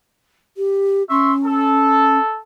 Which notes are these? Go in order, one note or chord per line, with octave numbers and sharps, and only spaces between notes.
G4
C#4 E5 C6 C#6
A4